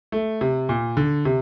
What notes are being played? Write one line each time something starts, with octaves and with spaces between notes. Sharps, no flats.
A3
C3
A#2
D3
C3